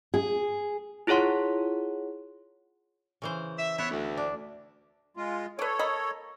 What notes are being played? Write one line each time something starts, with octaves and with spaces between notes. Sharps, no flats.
G#4
E4 F4 G#4 C#5 F#5 C6
C#3 E3 C5
E5
B3 E4 C#5 E5
D2
D4
G#3 F4
A4 B4 C#5 D5
A#3 D#5 B5